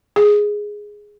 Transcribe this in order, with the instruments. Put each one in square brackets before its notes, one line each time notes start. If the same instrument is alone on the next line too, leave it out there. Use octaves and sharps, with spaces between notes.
[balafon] G#4